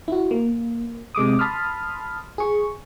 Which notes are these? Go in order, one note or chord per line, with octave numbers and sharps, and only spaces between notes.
E4 F#4
A#3
C3 G#3 D6 D#6
A5 B5 C6 D#6 F6
G#4 C#6